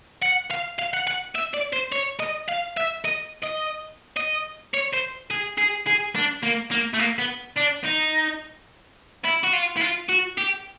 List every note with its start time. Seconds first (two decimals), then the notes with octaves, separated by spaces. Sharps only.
0.22 F#5
0.51 F5
0.79 F5
0.93 F#5
1.07 F#5
1.35 E5
1.54 D5
1.73 C5
1.92 C#5
2.19 D#5
2.48 F5
2.77 E5
3.05 D#5
3.43 D#5
4.17 D#5
4.74 C#5
4.93 C5
5.31 G#4
5.58 G#4
5.86 G#4
6.15 D4
6.43 A#3
6.71 A#3
6.94 A3
6.99 A#3
7.18 B3
7.56 D4
7.84 D#4
9.25 E4
9.44 F#4
9.53 F4
9.77 E4
9.81 F4
10.09 F#4
10.38 G4